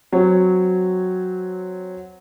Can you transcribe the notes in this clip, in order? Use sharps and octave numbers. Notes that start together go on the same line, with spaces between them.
F#3 C4 C#5